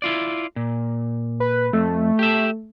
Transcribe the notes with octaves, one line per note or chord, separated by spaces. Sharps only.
E4 F4 D5
A#2
B4
F2 A3
G4 E5